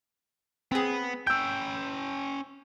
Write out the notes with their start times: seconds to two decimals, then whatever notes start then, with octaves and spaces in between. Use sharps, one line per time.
0.72 B3 C4 G#4
1.27 C#4 G5 E6 G6